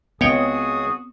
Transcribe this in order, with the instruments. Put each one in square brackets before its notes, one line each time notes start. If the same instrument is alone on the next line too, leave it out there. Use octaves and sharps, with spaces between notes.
[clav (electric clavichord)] C#2 C#5 G5 [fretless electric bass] B3 C4 [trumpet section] F#4 G#4 D#6